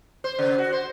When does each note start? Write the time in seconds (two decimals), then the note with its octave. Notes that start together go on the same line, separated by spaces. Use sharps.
0.24 C5
0.39 C#3
0.58 F#4
0.72 C5